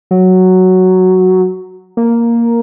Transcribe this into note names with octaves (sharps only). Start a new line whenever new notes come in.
F#3
A#3